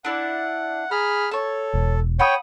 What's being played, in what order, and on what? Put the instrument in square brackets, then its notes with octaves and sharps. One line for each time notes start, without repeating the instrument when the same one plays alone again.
[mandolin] D4 E4 D5 [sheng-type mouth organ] F#5
[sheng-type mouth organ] G#4 B5 F6 [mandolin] A#5
[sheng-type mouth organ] A4 [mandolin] C#5 A5
[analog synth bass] E1
[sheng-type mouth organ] C#5 G5 [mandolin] F#5 B5 D#6